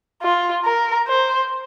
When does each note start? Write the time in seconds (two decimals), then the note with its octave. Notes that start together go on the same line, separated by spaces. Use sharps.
0.22 F4
0.65 A#4
1.08 C5